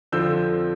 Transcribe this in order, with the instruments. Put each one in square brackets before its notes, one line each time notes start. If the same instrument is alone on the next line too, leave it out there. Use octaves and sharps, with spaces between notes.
[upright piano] F2 D3 F3 C4 E6 G6